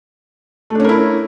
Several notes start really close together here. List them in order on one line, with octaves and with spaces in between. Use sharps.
A3 D4 C#4 A#4 E4